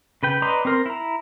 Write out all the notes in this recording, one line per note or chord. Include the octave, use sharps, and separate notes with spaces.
C#3 B4 G5
B4 D5 D#5 A#5 C6
C4 A#4 C6
E4 A#5